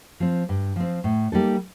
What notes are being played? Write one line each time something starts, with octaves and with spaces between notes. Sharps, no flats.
F3 C4
G2
F3 C4
A2
G3 A#3 D#4 A4